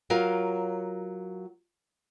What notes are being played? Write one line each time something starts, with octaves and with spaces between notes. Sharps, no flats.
F#3 F4 A#4 F5